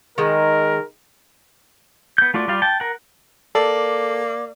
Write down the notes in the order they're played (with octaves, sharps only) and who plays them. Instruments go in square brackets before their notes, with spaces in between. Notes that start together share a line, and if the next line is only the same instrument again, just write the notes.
[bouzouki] D#3 G#3 [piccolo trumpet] A#4
[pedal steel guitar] B3 G6
A3 F4 F#4 D5
G3 F4 G4 D5 F5
G5 A5
A#4 F#5
[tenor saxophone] A#3 [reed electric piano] A4 [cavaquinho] D5